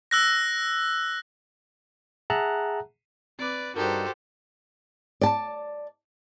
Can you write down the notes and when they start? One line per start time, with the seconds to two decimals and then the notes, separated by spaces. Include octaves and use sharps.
0.11 E6 F#6 A#6
2.30 G#4 E5 F#5 A5 A#5 F#6
3.39 C4 B4 D5 D6
3.76 G2 D4 D#4 F#4 G4 A4 A#4 C5
5.21 D5 A5